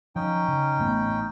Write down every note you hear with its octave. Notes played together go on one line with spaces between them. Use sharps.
F3 C#4 D#4 G5
C#3
A1 A3 B3